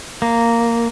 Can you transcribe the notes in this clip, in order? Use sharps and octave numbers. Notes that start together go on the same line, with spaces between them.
A#3